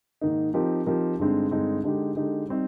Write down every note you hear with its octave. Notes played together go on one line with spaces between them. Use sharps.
G#2 D#3 A#3 D#4
F3 C4 D#4 G4 A#4
F3 C4 D#4 G4 A#4
G2 D3 G#3 C4 D#4
G2 D3 G#3 C4 D#4
D3 G#3 D#4 G4
D3 G#3 D#4 G4
G3 C4 D#4